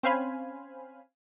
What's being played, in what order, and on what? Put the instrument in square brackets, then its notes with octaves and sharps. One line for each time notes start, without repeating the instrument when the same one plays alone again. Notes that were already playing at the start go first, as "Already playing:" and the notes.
[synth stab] C4 C#4 C5 F5 G#5 B5